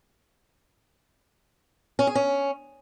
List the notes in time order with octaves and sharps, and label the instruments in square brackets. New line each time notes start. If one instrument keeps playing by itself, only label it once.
[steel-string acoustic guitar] C#4
G#4
C#4